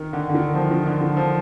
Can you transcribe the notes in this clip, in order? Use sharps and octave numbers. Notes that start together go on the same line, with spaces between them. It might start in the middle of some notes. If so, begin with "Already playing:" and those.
Already playing: D#3
D3
D3
D#3
F3
D#3
D3
D#3
F3